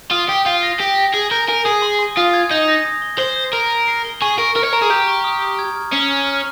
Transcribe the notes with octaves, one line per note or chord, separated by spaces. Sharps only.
F4 D#6
G4 D#6
F4 G6
A#6
G4 D#6
A#6
G#4 G#5
A#4 G6
A#4 G#5
G#4 D#6
C6
C6
F4 D#6
G#6
D#4 G6
A#6
D#6
G7
C5 G6
G6
A#4 C6
D#7
C7
G7
G#4 C#6
A#4 C#6
A#4 F6
C#5
A#4 A#5
G#4
G4 G6
C#6
D#6
D#6
G#6
F6
C#4 C7
F6
F6